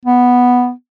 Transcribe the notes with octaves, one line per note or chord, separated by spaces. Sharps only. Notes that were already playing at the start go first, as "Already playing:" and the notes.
B3